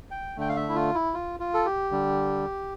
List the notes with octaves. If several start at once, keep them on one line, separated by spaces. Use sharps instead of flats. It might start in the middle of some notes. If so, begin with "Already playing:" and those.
G5
D3 A3 G5
F5
E5
E4
F4
E4
F4
F4
A4
G4
D3 G3